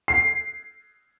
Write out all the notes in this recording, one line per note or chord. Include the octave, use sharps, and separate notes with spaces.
C7